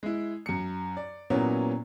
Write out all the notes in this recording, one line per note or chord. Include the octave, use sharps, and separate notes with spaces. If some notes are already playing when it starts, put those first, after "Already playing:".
G#3 E4
F#2 C#7
D5
A#2 F#3 A#3 B3 C#4 E4